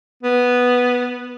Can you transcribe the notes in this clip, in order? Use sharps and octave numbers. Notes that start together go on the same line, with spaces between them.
B3